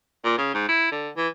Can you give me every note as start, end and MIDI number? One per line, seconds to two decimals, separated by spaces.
0.24 0.37 46
0.38 0.51 49
0.54 0.67 44
0.68 0.88 64
0.91 1.09 50
1.17 1.28 52